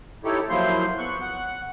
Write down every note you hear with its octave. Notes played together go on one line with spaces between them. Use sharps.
D#4 E4 G4 A4 C#5
F3 F#3 A#3 E4 C6 G6
B3 C#6 F#6
F#5 F#6